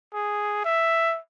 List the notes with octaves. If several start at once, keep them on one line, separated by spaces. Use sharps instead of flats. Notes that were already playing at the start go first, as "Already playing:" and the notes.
G#4
E5